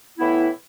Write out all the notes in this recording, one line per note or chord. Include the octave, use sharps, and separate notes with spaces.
A2 E3 B3 E4